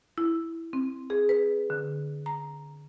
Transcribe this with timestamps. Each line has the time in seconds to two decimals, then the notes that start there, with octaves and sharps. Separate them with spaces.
0.18 E4
0.73 C4
1.10 G#4
1.29 B4
1.70 D3
2.26 A#5